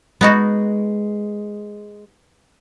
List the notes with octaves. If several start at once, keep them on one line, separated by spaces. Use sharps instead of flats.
G#3 B3 D#4 F#4